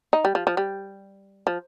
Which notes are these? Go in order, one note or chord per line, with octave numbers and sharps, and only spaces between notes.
D#4
G3
F3
F3
G3
F3